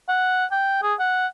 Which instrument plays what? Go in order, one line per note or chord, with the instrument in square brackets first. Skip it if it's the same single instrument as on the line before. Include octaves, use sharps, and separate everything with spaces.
[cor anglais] F#5
G5
G#4
F#5